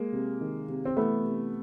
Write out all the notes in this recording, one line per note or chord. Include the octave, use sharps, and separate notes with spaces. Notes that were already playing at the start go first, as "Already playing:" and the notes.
Already playing: G#3 A#3
C3
D#3
C3
C4
E3 A3 B3
C3